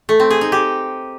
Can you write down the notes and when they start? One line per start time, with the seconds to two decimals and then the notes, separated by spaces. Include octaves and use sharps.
0.09 A3
0.20 C4
0.30 G#4
0.41 D#4
0.52 G4